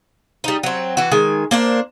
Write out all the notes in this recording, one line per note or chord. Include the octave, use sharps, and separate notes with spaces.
G3 D#4
F#3 C4
E3 F#4
D#3 G#3 G#5
A#3 D4 C5